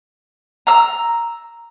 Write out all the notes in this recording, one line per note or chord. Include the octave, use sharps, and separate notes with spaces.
A#5 E6